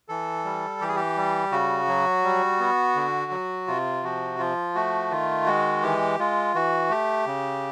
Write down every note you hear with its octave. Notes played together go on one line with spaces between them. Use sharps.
E3 A4
G3
E3 G4
G#4
G4
G3
C#3 F#4
F#3
G3
B3
D3
F#3
C3 F4
F3 F#4
F3 F4
A3 F#4
D#3 F4
G#3 F#4
E3 G4
G#3 F4
E3 F#4
A3 G4
C#3